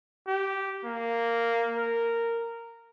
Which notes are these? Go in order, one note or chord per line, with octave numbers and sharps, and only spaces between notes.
G4
A#3
A#4